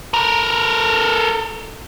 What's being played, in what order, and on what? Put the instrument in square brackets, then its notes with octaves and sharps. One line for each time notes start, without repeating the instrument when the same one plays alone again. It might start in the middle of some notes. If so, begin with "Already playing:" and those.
[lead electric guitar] A4 A#4